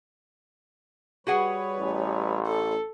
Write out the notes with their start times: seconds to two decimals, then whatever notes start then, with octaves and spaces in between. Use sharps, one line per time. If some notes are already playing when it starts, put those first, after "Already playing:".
1.27 G3 F#4 G#4 B4 C#5 F#5
1.80 A1
2.47 A4